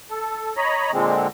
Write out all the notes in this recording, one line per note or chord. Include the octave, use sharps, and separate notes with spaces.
A4
C#5 D#5 A#5 B5
A#2 D3 G#3 C4